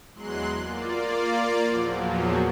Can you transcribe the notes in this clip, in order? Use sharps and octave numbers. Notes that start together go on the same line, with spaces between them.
E2 F#3 G#3 C6 F#6
A#3 F4 D5
E2 A#2 F3 F#3